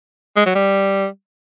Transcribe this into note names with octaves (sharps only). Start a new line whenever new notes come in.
G#3
F#3
G3